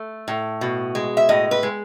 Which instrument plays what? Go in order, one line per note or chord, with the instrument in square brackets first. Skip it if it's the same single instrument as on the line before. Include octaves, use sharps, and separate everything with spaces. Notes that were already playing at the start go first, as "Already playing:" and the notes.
Already playing: [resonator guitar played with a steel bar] A3
A2
B2
G#3
E5
A2 D#5
B4
G#3